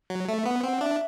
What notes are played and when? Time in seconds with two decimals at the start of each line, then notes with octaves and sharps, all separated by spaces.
0.10 F#3
0.28 A3 E5
0.39 E5
0.45 B3 F#5
0.63 C4 F#5
0.81 D4 E5